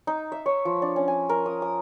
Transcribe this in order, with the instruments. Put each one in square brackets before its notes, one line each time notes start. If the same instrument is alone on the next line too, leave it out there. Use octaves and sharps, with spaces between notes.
[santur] D#4
E5
C#5
F3
D4
C#4
G#5
A#4
D#6
D#6